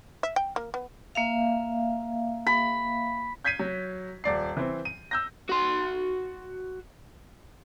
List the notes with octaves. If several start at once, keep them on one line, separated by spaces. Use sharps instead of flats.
E5
G5
A#3
B3
A#3 E5 F5
B5
G6 G#6 B6 C7 D#7
F#3
D#1 D5 C7
E3 C4
D#7
E6 G6 A#6
F#4 C6